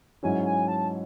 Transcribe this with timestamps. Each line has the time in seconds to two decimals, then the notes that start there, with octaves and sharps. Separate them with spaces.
0.23 G#2 F#3 C#4 E4 G#5
0.46 G#5
0.68 A5